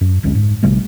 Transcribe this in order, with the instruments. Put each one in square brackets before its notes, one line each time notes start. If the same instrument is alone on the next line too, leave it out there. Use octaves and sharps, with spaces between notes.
[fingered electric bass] F#2
G#1 D2 G#3 C#4
G#2
A#1 C3 G3 A3